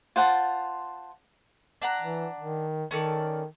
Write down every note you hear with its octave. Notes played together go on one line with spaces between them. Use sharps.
F4 C5 F#5 A5
D4 F#5 A#5
E3
D#3
D#3 C#4 A4 D5